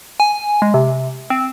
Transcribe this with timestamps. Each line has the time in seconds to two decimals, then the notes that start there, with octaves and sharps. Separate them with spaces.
0.20 G#5
0.62 G#3
0.74 C3
1.30 C4